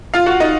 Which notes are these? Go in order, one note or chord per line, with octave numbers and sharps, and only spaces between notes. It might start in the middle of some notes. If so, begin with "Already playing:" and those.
F4 F5
F#4 F#5
D#4 D#5